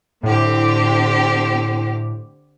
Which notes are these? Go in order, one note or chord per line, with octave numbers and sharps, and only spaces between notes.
A2 D3 C4 G4